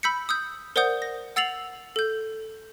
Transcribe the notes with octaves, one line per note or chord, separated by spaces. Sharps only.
B5 E6 G6 B6 C#7
D#6 E6 G6
A#4 C5 D5 F#5 D#6 G6
A#6
F#5 E6 A6 C7 F7 F#7
A4 G6